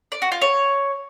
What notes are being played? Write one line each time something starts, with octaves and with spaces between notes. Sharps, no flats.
D5
F#4
F4
C#5